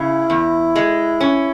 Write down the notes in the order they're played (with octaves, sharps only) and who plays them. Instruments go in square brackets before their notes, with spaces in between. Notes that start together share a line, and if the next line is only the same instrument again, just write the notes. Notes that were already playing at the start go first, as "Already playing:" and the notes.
Already playing: [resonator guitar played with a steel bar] C#3 [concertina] E4
[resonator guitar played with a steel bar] E2
G#3
C#4